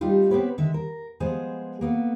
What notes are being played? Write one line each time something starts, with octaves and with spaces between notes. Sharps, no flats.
G3 A3 C4 D#4 F4 G4
B3 C4 D4 G4 B4 C#5
D3 D#3 G#3 E5
A#4
F3 G#3 B3 G#4 C5 G#5
A#3 B3 A4